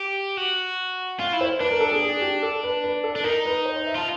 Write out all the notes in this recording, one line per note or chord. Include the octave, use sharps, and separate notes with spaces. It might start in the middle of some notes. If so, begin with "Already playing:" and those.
Already playing: G4
F#4
F4 F5
E4
C5
D4 B4
A#4
A4
G#4
G#4
G4
A4
B4
B4
A4
D4
D#4 A#4
B4
C5
C5
E5
F4 A5